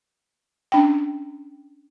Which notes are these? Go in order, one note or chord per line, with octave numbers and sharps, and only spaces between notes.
C#4 D4 G5